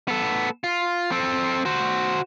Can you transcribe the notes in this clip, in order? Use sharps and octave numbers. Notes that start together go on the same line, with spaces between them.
B3 A4
F4
C4 A4
F#4 C5